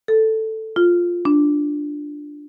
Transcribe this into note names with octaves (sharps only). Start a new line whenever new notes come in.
A4
F4
D4